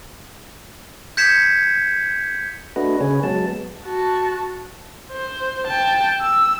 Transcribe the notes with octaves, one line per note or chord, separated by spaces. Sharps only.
G6 G#6 B6 C#7 E7
A3 D4 F#4 B4 D#5
C#3 C#4 G#4 B4 C#5
F#3 G#3 B3 A5
F#4 A5
C5
G5 A5
E6